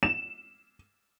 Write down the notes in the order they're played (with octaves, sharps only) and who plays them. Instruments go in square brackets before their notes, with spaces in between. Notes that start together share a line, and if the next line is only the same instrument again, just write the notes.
[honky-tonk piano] E7